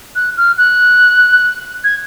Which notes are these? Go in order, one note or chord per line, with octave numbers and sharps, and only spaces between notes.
F#6
F6
F#6
G#6